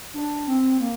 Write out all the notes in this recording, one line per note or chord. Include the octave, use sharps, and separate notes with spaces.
D4
C4
A#3